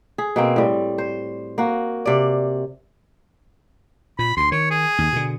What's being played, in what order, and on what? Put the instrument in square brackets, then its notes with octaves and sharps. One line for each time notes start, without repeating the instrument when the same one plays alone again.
[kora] G#4
B2 A#3 C4
A2 G3
C5
A#3 F#4
C3 D5
[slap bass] A#2 [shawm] B5
[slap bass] D2 [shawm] C6
[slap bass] D#3 [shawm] C#5
[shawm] G#4
[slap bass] D#2
B2 D3